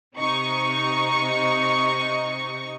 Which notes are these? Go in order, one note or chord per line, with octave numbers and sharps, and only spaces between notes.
C3 D#4 C#6